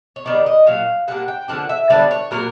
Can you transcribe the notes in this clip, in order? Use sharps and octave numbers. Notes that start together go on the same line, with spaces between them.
C#5
D#3 G3 B3 D#4 D5
D#5
A#2 F#3 A#3 F5
A#2 G3 A#3 D4 F#5
G5
D3 F3 A#3 D4 F#5
E5
D3 G3 B3 D4 D5
C#5
A#2 F#3 A#3 A#4